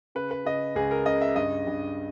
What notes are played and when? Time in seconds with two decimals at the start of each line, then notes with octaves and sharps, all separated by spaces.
0.15 C#3 B4
0.31 B4
0.45 C#3 D#5
0.76 C#2 G#4
0.91 A#4
1.06 C#3 D#5
1.21 E5
1.36 G2 D#5
1.67 G2